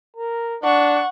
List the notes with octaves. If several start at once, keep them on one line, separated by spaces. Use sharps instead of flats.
A#4
D4 F#5 C#6